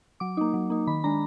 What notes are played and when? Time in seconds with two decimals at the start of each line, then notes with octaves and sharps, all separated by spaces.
0.20 F#3 D6
0.37 A#3 D#4
0.54 F#3
0.70 A#3 D#4
0.87 D#3 B5
1.04 G#3 D4 A#5